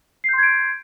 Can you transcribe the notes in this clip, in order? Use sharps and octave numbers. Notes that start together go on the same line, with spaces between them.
C6 G6 G#6 C7 D7